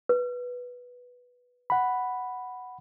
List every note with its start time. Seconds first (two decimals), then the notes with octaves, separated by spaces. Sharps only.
0.09 B4
1.70 F#5 B5